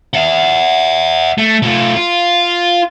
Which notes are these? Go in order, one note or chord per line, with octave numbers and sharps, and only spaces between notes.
E5 F#5
A3
A3 F4
F4